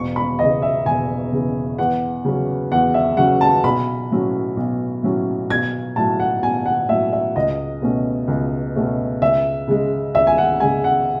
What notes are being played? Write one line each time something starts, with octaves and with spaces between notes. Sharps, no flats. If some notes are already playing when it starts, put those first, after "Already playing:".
Already playing: E1 C#6
B5
E2 C#3 D#5
E5
E1 G#5
E2 C#3
E2 F#5
C#3 F#3 C#4
E2 F#5
E5
C#3 F#3 C#4 F#5
A5
B1 B5
A2 F#3 C#4
B1
A2 F#3 C#4
B1 G#6
A2 F#3 A5
F#5
B1 G#5
F#5
A2 F#3 E5
E5
C#2 D#5
B2 A3 C#4
C#2
B2 A3 C#4
C#2 E5
C#3 G#3
C#2 E5
G#5
F#5
C#3 G#3 G#5
F#5